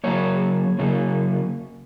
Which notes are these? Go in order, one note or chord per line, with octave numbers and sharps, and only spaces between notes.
C#3 F#3 A#3 C#5
C#3 F#3 A#3